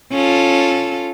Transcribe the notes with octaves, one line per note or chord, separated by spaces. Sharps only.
C#4 F4 A4